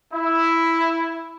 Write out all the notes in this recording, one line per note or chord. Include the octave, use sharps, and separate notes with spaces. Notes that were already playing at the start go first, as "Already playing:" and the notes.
E4